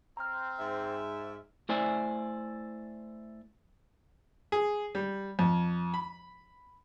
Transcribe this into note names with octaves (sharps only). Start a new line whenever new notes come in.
C4 A#5 F6
G#2 E5
A3 E4 C5 D5 G#5
G#4
G3
F2
B5